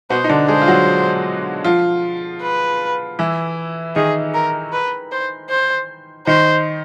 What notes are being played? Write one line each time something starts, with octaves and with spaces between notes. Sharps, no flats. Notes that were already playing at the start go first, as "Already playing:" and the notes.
B2 B3 C5
D#4
D3 D4
G#3 G#4 C5
F4
F#3 F#4
F3 F4
B4
E3 E4
D#3 D#4 G#4
A#4
B4
C5
C5
D#3 D#4 C5